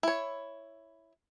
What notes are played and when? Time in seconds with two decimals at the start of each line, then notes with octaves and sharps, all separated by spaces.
0.03 E4 C#5